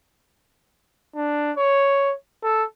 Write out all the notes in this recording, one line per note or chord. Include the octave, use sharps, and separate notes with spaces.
D4
C#5
A4